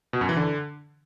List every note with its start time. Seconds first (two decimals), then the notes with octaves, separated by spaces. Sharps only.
0.13 B2
0.21 F#2
0.29 E3
0.37 D3